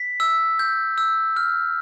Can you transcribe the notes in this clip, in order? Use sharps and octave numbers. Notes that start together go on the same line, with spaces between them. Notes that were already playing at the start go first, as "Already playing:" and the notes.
Already playing: B6
E6
G6
E6
F6